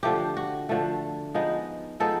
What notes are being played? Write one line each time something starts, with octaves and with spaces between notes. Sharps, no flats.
D3 F3 A3 G4
F#4
D3 F3 A3
F3 G#3 B3 D#4
F3 G#3 B3 D#4 A4